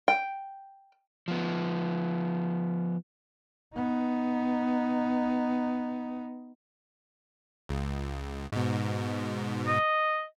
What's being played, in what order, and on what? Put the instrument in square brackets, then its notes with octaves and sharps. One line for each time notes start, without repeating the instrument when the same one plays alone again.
[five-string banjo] G5
[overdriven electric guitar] F3 B3
[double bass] B3 D#4
[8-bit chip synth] C#2
G#2 B2
[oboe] D#5